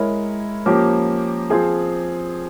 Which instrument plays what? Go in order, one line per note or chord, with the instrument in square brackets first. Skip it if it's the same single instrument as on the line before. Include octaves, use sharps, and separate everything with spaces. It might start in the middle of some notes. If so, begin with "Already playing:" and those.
Already playing: [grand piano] G#3 E4 A#4 C#5
F3 A#3 C#4 G4 A#4
F3 C4 F4 G#4